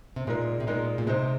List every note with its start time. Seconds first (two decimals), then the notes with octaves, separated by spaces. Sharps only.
0.16 C3
0.27 A#2 G#3 D#4 A#4
0.60 C3
0.67 A#2 G#3 D#4 A#4
0.98 A#2
1.07 C3 G#3 D#4 C5